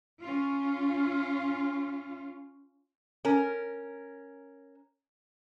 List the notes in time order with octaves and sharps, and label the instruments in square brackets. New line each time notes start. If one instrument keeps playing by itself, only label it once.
[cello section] C#4 F4
[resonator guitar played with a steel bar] C#4 A#4